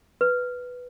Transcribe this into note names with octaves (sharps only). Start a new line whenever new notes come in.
B4